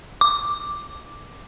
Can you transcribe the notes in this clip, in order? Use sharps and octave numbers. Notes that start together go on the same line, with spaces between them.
D6